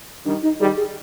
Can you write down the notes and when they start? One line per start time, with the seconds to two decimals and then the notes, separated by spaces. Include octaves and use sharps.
0.25 D#3 G3 D4
0.43 D#4
0.60 D#3 G3 G#4
0.77 G#4